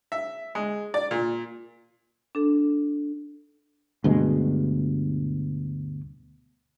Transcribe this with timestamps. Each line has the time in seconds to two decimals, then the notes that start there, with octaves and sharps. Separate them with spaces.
0.12 E5
0.55 G#3
0.94 D5
1.11 A#2
2.35 D4 A4
4.04 D2 G2 B2 G#3